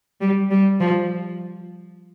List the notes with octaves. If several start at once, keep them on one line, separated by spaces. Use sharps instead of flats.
G3
G3
F3